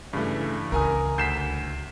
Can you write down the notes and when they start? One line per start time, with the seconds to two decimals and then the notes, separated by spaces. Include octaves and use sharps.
0.13 G2 C#3 E3 A3
0.72 C#2 C#4 A#4 G#5 D#6
1.18 D2 G6 B6 C7 E7